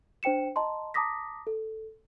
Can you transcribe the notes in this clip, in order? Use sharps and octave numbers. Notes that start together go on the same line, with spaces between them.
D4 C5 G5 C#7 E7
D#5 A5 A#5 C6
A5 A#5 D6 D#6 A#6 B6
A4